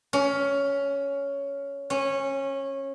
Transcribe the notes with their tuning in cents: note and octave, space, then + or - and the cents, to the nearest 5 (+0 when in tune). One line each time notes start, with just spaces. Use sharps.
C#4 +10
C#4 -20